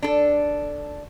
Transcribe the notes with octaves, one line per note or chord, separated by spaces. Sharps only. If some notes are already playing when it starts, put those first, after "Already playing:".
D4 A4